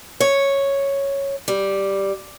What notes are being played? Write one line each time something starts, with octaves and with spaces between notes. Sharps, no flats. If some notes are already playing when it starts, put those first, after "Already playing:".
C#5
G3